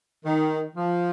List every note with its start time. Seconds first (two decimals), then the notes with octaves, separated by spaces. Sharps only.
0.25 D#3
0.76 F3